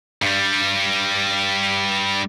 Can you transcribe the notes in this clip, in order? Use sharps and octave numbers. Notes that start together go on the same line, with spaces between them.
G2 G3